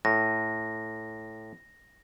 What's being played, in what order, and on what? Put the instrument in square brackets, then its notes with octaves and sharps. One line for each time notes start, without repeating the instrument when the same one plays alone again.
[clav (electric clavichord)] A2 [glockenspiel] A#6